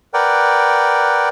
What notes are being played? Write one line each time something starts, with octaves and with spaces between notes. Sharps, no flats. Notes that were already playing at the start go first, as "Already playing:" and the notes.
A#4 B4 D5 F#5 G5